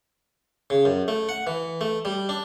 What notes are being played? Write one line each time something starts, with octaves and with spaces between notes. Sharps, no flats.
C#3
F#2
A3
F#5
E3
A3
G3
D4